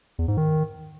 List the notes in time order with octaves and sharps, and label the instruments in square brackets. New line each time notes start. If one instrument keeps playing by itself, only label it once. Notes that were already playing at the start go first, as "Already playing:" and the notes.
[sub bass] E2
G#2
D#3